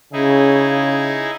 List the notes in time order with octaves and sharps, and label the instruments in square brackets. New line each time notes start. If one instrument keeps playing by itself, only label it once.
[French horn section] C#3 [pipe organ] D#4 E4 G#4